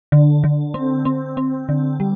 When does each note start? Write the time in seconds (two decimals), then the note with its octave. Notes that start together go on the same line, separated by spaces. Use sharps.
0.12 D3
0.44 D3
0.74 C4
1.05 C4
1.37 C4
1.69 D3
2.00 G3